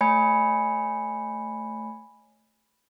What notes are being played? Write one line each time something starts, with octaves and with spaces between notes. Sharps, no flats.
A3 C#5 G#5 B5 G#6 C#7